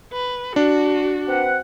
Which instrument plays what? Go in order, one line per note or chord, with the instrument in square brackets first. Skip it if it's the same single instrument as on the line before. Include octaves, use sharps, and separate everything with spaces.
[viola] B4
[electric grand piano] D4 [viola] F#4
[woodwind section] C4 B4 F#5